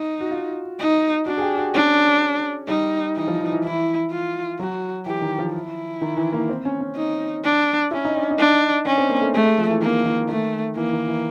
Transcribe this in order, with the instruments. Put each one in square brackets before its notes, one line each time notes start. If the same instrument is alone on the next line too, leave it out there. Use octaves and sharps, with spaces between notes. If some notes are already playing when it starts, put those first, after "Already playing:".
Already playing: [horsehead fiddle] D#4
[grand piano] F#4
F4
[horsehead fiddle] D#4
[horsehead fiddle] D4 [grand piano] F#4
[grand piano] G#4
G4
F#4
[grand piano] C#4 [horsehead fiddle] D4
[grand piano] G3 [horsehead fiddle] D#4
[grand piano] E3 [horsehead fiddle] D#4
[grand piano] F3
E3
E3
[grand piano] E3 [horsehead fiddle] E4
[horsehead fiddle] F4
[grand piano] F#3 [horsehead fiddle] F#4
[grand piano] E3 [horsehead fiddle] G4
[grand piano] D#3
F3
[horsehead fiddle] E4
[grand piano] D#3
E3
A#3
C4
C#4
C#4
[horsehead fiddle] D#4
D4
[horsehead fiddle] C#4 [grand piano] E4
[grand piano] D#4
D4
D#4
[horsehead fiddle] D4
[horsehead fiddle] C#4 [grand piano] D4
[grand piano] C4
A#3
A3
[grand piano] G#3 [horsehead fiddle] A3
[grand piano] G#3
F3
E3
[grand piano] D#3 [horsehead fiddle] A#3
[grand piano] D#3
[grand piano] D#3 [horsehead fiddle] A3
[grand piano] E3 [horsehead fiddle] A#3
[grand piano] D#3
E3